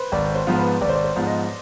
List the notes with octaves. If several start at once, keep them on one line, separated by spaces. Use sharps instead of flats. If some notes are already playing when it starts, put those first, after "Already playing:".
Already playing: B4 C5
G#1 D5
C5
G#2 F3 B3 F4
B4
G#1 D5
C5
D5
C5
G#2 F3 B3 F4
D#5